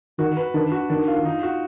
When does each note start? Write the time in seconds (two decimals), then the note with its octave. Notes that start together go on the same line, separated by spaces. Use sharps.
0.19 D#3 F#4
0.37 B4
0.54 D#3 D4
0.72 F#4
0.90 D#3 D4
1.08 F4
1.25 D#4
1.43 F#4